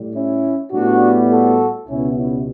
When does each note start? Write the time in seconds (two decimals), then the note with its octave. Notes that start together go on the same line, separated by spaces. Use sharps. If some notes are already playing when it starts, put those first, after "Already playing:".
Already playing: A2 G3
0.15 C#4 E4
0.73 A2 G3 B3 D4 F#4
1.30 F#4 A4
1.88 C#2 B2 G3 B3 C#4 E4
2.17 C#4 E4